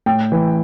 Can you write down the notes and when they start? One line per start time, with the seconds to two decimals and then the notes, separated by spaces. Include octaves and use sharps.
0.06 A2 G5
0.32 E3